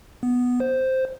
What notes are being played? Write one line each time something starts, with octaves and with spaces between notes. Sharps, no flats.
B3
C5